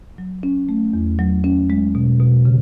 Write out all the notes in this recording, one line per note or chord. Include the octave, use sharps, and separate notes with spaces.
F#3
C#4
A3
E2
F#3
C#4
G#3
B2
B2
C#3